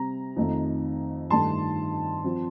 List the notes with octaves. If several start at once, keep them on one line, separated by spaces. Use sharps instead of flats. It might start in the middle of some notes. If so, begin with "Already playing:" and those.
Already playing: C3 G3 C4 A#5
F2 D#3 A3 D#4
G2 D#3 A3 D#4 A5 C6
F3 C4